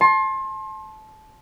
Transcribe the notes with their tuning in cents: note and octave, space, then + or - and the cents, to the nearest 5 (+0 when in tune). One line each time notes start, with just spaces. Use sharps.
A5 -20 C6 +30